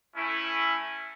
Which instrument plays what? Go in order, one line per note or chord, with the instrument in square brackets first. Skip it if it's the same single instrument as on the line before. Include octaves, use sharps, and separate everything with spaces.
[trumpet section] A3 C#4 E4